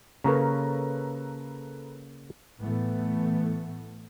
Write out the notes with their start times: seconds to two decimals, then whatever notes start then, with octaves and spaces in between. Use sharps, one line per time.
0.24 C#3 A#3 A4 B4 C#5 A#5
2.60 A2 E3 A3 B3